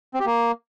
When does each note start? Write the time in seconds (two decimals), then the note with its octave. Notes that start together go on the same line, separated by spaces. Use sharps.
0.14 C4
0.20 G4
0.26 A#3